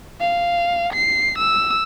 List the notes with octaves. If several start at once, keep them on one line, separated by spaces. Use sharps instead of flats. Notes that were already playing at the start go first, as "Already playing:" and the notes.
F5
C7
E6